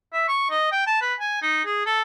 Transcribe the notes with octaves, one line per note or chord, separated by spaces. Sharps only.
E5
C#6
D#5
G5
A5
B4
G#5
D#4
G#4
A4